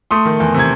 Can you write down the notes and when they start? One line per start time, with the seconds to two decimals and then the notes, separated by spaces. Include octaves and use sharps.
0.11 A3 C6 D#6
0.25 D#3
0.40 E2
0.54 C3
0.59 G#6